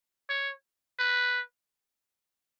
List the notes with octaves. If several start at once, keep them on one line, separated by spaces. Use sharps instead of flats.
C#5
B4